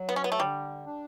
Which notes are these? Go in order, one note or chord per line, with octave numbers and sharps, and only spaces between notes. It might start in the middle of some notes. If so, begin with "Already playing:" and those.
Already playing: F#3
B3
C#4
B3
A3
D3 G3
D4